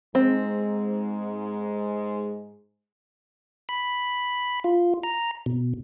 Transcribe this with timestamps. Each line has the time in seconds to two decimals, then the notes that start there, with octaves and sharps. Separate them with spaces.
0.15 G#2 G#3 C4
3.69 B5
4.64 F4
5.03 A#5
5.46 B2